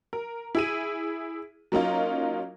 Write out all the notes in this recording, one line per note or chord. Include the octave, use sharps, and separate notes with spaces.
A#4
E4 G#4 D#7
F#3 A#3 C#4 D#4 F4